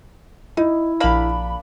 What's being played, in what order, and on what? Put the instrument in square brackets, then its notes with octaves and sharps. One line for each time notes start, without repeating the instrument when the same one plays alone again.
[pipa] D#4 [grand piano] E4
[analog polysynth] A#1 B5 [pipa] A#3 D4 F5